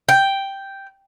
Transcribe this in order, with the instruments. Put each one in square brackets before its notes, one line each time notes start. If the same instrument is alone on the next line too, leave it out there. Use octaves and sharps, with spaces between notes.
[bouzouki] G5